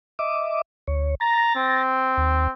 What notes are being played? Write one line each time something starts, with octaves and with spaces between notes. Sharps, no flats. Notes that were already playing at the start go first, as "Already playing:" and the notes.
D#5 E5 D6
D2 C#5
A#5 A6 A#6
C4
D#2